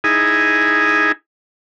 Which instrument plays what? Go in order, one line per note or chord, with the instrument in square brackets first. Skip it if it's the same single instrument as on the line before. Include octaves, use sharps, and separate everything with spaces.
[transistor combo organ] D#4 E4 G#4 G#5